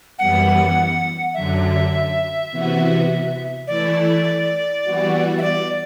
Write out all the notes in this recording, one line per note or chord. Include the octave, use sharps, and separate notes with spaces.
F#2 E3 G3 B3 F#5
F#2 D3 F#3 E5
C3 E3 B3 F#4
E3 A3 E4 D5
E3 G3 B3 F#4
E5
D5